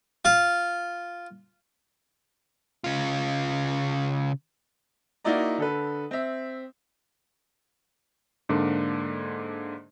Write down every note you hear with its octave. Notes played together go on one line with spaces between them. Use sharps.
F4
C#3 F4
A#3 D#4 E4 F#4 D5 A#5
D3 A4 B4
C4 E5
G#2 D3 A#3 D4